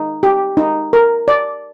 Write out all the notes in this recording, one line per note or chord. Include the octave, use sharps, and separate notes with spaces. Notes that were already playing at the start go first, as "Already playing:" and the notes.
Already playing: D#4
G4
D#4
A#4
D5